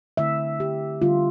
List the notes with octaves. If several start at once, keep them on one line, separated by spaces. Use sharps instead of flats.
D3 A3 C4 E4 E5
G4
D3 G3 B3 D4 F4